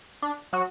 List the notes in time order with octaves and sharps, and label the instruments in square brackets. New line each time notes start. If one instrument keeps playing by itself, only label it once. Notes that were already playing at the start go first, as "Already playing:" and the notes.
[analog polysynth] D4
F#3 F#4